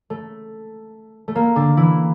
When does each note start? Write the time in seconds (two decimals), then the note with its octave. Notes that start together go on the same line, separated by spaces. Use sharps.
0.10 A3
1.28 A3
1.35 A#3
1.56 D3 D4
1.77 E3 E4